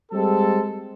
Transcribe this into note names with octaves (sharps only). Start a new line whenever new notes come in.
G3 G#3 C4 A4